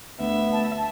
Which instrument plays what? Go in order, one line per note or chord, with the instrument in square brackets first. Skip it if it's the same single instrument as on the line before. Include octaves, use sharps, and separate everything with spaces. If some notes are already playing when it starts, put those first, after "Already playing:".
[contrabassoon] D2 [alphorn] B3 [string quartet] E5
[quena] A5